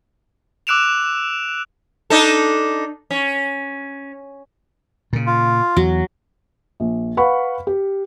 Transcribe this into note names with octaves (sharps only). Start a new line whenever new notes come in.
D6 E6 F#6 D7 E7 F7
D4 D#4 A4
C#4
A#2 C#3
F4
E2 F#3
A#1
B4 F5 F#5 B5 C#6
G4